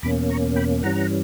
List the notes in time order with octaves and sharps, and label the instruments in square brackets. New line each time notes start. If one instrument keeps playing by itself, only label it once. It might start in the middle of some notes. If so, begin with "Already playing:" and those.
[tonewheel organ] E2 B2 A#3 C#4 B5 D6
A#5 C#6
G5 B5
G2 E3 G3 C#4 F#5 A#5